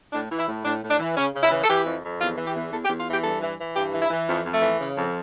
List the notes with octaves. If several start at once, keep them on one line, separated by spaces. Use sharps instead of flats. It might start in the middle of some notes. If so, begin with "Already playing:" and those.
A2 D4
E3
E4
A2
A2 D4
A2
D4
E3
C#3 C#4
C#3
E4
E3
A4
E3 G4
F2
F2
E2 F4
E3
G4
E2
E2 A4
G4
E2
F4
E3 G4
G2 A4
E3
E3
G2 G4
E3
E4
E3
F2
F2
A3
E3
C#3
F2